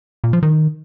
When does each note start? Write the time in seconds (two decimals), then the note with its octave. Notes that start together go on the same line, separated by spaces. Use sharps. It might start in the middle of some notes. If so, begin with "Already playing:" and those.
0.24 A#2
0.33 F3
0.43 D#3